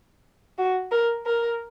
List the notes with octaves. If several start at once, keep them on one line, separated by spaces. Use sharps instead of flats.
F#4
A#4
A#4